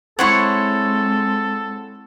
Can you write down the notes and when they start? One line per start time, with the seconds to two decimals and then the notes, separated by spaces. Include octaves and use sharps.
0.19 G#3 C4 E4 A4 C5 C#5 F#5 C#6